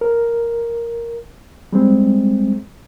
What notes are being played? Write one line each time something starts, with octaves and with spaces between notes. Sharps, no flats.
A#4
G3 G#3 C4